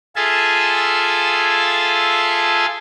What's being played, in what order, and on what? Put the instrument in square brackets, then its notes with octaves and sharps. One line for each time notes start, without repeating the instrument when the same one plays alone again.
[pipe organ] F4 G#4 A4 E5 G#5 A5